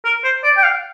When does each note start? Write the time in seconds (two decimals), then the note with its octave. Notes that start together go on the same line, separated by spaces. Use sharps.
0.05 A#4
0.24 C5
0.44 D5
0.57 G5
0.64 F5